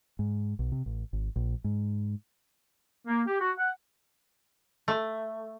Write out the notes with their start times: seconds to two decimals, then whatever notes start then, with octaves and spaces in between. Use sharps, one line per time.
0.19 G#2
0.59 B1
0.72 C3
0.86 A1
1.13 G#1
1.36 A#1
1.64 G#2
3.07 A#3
3.27 G4
3.41 F#4
3.58 F#5
4.88 A3